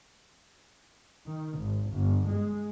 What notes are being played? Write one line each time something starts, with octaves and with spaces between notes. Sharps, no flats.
D#3
G#1
G1
G#3